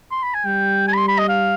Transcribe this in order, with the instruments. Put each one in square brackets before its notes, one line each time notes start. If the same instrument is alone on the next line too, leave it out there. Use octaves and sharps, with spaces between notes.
[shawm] C6
B5
G#5
[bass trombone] G3 [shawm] G5
[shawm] G#5
B5
C6
B5
D#5
F5